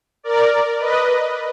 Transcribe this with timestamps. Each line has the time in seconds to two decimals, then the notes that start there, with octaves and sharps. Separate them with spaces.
0.23 A#4 D5
0.79 B4 D#5